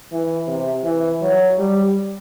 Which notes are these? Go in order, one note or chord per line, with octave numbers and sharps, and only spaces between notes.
E3
C3
E3
F#3
G3